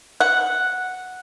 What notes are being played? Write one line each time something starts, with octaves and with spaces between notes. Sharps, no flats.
F#5